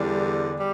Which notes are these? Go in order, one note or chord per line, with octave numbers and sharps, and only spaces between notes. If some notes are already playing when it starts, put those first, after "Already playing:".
Already playing: E2 D3 G3
G3